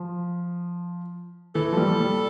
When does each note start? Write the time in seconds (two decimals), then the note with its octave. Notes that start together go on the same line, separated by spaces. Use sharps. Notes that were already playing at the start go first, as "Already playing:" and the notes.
Already playing: F3
1.55 E3 A4
1.72 F3
1.77 G3
2.00 G3